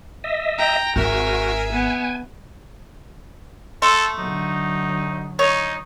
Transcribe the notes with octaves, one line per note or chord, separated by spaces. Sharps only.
D#5 E5
G5 A#5
G#1 F#4 G#4 A#4 E5
B3 G#5
A3 A4 C6
D3 F#3 D#4
D#4 C#5 C#6